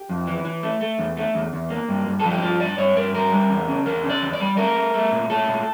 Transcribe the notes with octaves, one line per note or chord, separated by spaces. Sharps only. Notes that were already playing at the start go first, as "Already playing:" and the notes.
Already playing: G4
F2
E3
E3
A3
A3
E2
A3
E2
E2
A#3
G2
G2
F3 A4
G4
G2 F4
G2 D5
G2 C#5
G2 A#4
G3 A#4
G3
E2
C#3
E2 A#4
C#3
D5
E2
D5
G3
A3 A#4
A3
A3
A#2
A3 A4
A#2